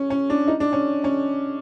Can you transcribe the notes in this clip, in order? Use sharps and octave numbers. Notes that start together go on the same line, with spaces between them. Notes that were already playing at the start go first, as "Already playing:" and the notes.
Already playing: C#4
C#4
D4
D#4
D4
C#4
C#4